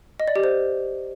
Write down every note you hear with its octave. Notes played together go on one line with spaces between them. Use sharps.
D#5
D5
G4
C5